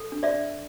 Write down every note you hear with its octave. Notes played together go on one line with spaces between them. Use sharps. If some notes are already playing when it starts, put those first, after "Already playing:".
Already playing: A4
D4
D5 E5
D4